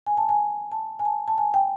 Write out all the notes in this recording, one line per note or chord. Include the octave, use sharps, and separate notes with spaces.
G#5
A5
G#5
A5
G#5
A5
A5
G#5
G5